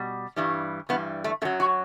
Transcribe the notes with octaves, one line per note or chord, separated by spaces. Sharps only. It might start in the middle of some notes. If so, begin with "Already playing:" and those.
Already playing: B2 G3
G2 E3 G3
G2 E3 G3 B3
A3
F#2 F#3 A3
F#4